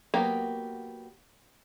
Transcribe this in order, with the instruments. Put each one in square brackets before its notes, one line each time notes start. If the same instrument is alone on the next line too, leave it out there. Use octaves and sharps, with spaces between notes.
[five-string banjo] F#3 A#3 B3 G4 A#4